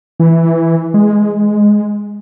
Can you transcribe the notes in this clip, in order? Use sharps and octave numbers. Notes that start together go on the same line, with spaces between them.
E3
G#3